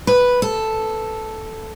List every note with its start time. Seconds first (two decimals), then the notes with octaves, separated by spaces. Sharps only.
0.07 B4
0.42 A4